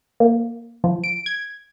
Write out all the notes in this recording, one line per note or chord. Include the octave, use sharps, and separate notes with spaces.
A#3
F3
D7
G#6